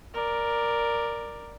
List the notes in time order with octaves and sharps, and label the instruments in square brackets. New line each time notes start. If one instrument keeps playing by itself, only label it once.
[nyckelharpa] A#4 D5